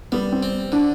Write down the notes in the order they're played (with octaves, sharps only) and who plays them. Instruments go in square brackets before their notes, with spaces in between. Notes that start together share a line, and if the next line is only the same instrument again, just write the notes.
[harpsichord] G3 [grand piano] B3
[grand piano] C4
[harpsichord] C4
[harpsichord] D3 [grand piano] D4